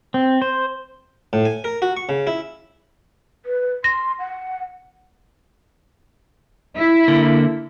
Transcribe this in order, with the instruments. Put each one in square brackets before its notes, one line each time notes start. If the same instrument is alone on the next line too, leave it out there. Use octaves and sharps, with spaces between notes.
[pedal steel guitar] C4
C5
[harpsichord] A2
G#5
A#4
F#4
C#6
C#3
E4
[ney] B4
[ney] C6 [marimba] A#6
[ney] F#5
[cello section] E4
[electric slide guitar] D3 A#3